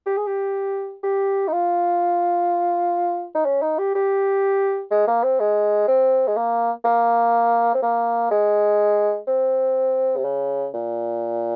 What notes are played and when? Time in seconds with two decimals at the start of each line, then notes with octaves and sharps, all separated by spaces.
0.06 G4
0.17 G#4
0.27 G4
1.03 G4
1.48 D#4
1.52 F4
3.35 D#4
3.46 C#4
3.62 D#4
3.79 G4
3.95 G4
4.91 G#3
5.08 A#3
5.24 C4
5.40 G#3
5.88 C4
6.28 G#3
6.37 A#3
6.85 A#3
7.75 C4
7.83 A#3
8.31 G#3
9.27 C4
10.17 C3
10.24 C#3
10.74 A#2